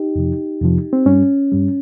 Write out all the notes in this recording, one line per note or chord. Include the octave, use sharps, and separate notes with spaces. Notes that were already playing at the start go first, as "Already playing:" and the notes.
Already playing: D#4 G4
F2 C3 F3
F2 C3 F3
C4
G2 G3 C#4
G2 G3